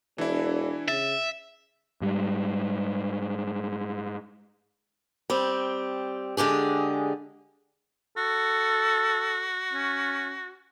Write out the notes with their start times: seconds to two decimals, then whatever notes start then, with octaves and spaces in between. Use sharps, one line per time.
0.18 E1 E3 D4 E4
0.88 C#3 E5 A6
2.01 G#2 G3
5.30 G3 C4
6.37 D3 G#3 G4 G#4
8.17 F#4 A4
9.73 C#4